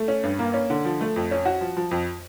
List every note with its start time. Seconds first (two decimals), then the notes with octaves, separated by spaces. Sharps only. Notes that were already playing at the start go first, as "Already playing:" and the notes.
Already playing: A3
0.08 C#4
0.23 G2
0.39 A#3
0.54 C#4
0.70 D3
0.85 F3
1.01 A3
1.16 F2
1.31 C#4
1.45 F#4
1.61 F3
1.77 F3
1.91 F2